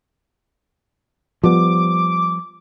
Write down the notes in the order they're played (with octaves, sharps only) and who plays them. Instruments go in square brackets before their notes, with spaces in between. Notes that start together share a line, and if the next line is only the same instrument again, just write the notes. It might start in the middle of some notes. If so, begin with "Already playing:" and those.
[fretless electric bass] F3 G3 B3 [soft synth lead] D6